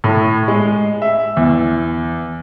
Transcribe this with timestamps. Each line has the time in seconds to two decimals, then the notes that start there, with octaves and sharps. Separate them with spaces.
0.04 A2
0.48 G#3
1.02 E5
1.37 E2